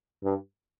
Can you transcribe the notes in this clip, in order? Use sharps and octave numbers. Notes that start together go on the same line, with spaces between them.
G2